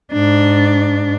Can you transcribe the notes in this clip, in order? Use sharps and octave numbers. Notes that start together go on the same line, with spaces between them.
G#2 D4